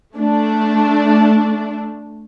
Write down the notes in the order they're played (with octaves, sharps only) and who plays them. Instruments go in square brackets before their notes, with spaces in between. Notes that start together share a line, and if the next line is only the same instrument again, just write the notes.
[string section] A3 D4